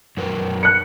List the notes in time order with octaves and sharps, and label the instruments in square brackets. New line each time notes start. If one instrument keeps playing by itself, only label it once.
[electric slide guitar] F#2 A#4 B4
[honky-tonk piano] F#6 C#7